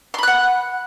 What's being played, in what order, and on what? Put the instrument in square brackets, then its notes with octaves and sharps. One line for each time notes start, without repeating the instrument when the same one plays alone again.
[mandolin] C6
B5
F#6
F#5